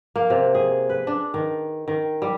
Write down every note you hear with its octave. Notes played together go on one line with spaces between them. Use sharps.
A#3
C3
G#4
B4
D4
D#3
D#3
G3